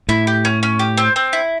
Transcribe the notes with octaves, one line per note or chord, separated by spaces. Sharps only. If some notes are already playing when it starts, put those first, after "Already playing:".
A2 E4
G4
C#4
C#4
G4
C4
C4
E4